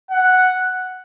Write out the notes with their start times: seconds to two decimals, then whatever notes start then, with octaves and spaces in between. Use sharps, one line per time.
0.11 F#5